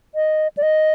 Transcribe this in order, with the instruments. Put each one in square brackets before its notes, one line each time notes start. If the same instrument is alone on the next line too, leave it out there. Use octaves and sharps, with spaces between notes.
[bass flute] D#5
D5
D#5